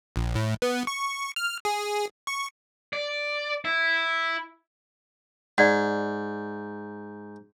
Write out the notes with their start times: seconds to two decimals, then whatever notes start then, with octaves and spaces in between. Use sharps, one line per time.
0.16 A#1
0.35 A2
0.62 B3
0.87 C#6
1.36 F6
1.65 G#4
2.27 C#6
2.93 D5
3.65 E4
5.58 G#2 D5 F#5